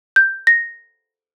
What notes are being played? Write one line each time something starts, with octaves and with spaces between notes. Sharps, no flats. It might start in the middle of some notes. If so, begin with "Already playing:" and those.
G6
A#6